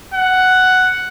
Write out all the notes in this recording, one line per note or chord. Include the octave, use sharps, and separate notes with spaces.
F#5